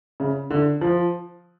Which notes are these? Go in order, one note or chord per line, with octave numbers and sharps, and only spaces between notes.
C#3
D3
F3